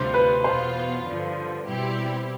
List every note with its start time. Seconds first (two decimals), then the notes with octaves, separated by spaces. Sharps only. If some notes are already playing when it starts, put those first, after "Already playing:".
Already playing: D2 C3 G3 D4 F4 C5
0.14 B4
0.44 E2 B2 B3 F4 C5
1.06 G2 D3 F3
1.67 B2 G3 C4 E4 G4